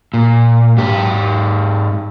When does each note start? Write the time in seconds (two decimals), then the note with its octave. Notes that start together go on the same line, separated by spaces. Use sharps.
0.14 A#2
0.77 G#2 G4